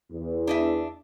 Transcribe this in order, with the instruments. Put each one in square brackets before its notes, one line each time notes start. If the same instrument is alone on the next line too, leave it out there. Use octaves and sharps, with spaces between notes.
[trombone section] E2
[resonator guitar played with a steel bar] D4 D#5 E5